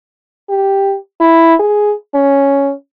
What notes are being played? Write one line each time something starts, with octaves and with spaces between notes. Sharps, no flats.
G4
E4
G#4
C#4